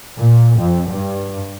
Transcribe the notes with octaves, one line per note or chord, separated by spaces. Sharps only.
A#2
F2
G2